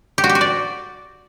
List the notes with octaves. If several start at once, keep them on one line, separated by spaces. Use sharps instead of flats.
G4
F#4
G4
F#4
D5